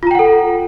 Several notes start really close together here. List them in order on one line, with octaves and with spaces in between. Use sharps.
F4 A#5 G5 F#5 A4